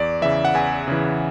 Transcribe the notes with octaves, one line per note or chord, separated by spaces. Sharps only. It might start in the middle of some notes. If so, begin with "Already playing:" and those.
Already playing: E2 D5
C#3 E3 E5
F#5
E2 G#5
C#3 E3